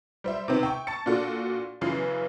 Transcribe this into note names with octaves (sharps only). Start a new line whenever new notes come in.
G3 C5 E5
C3 D#3 B3 C4
G5 C#6
A5 C#6 A6 C#7
A#2 D4 F#4 A4
F#2 C#3 E3 B3 C7